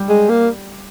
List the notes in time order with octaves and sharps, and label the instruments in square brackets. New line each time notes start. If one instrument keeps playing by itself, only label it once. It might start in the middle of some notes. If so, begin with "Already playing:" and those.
Already playing: [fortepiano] G3
[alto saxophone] G#3
A#3